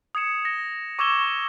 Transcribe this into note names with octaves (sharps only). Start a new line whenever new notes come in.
D#6 G#6 C#7 E7
A#6
C#6 D6 E6 G#6 E7 G7